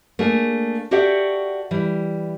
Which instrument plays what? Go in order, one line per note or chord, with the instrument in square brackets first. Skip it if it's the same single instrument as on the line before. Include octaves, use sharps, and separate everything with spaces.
[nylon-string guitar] A3 A#3 D4 G#4
F#4 G4 A4 D5 E5 F#5
E3 G3